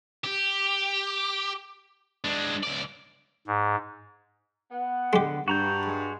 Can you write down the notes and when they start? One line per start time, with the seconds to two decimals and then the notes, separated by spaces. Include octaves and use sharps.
0.24 G4
2.24 G#3 D4
2.63 C#2 D5
3.47 G#2
4.71 B3 F#5
5.13 D3 G#3 G4
5.48 G2 F#4 A#5 G6
5.86 G#3